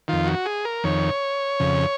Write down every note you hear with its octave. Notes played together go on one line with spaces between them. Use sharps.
F2 D#3 F4
F#4
G#4
A#4
F2 D#3 C#5
F2 C#3